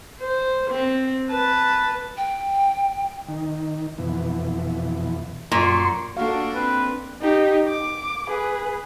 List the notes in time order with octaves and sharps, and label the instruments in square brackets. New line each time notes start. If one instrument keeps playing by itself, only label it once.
[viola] C5
C4
B4 A5
[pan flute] G5
[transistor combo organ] D#3
F2 B2 E3
[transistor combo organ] F#2 C6 C#6 [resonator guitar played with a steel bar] A#2
[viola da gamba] A#3 D4 [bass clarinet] F#4 [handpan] A4 F5
[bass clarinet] C4 [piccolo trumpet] B4
[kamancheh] D#4 G4
D6
G#4 B4